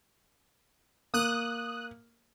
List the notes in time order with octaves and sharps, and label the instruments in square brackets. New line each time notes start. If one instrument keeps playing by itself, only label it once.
[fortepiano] A#3 [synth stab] D#6 F#6